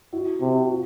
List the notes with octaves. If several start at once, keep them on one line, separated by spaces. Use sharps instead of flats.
E4 F#4
C3
F#4
F4